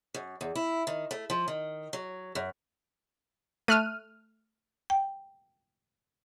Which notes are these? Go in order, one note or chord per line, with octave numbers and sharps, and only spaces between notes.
F#2
E2
E4
D#3
A3
F3
D#3
F#3
F#2
A3 F6 F#6 D#7
G5